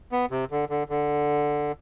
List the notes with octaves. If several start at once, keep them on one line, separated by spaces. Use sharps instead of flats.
B3
C3
D3
D3
D3